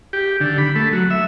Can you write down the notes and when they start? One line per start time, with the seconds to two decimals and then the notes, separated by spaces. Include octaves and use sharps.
0.13 G4
0.40 D3
0.58 B5
0.76 A3
0.93 F#3
1.10 E5